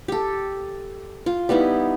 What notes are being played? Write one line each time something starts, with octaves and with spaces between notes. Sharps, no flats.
G4 A4
F4
G3 B3 D#4 E4